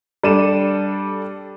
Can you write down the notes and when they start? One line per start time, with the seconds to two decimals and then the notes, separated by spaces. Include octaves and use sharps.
0.23 G3 D4 A4 D#7 E7